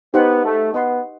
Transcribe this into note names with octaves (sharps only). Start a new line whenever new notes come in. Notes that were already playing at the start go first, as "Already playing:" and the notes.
B3 D#4 G4 C5 F#5
A3
B3 B4 D#5 F#5 C6